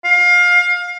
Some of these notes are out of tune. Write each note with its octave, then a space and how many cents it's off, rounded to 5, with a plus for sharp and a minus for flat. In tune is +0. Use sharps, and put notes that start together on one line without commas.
F5 +25